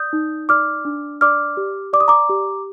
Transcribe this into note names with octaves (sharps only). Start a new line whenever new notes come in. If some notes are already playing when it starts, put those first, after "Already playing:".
Already playing: D5 D#6 G6
D#4
D5 D6 F6
D4
D5 D6 F6
G4
D5 D6
D#6
A#5 D6
G4